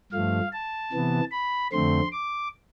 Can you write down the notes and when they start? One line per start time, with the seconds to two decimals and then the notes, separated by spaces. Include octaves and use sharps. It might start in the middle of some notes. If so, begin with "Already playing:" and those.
0.12 G2 F3 A3 F5
0.52 A5
0.93 C3 E3 B3
1.32 B5
1.72 F2 D3 A3 C4 C6
2.12 D6